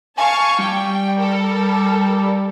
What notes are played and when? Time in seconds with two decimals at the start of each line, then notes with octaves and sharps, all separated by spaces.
0.18 F5 G#5 A5 C#6
0.59 G3 G5
1.17 A4 A#4